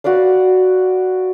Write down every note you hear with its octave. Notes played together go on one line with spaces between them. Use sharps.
F#4 B4 D5 F5